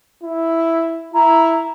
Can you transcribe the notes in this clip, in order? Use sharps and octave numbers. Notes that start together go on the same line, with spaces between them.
E4
E4 A#5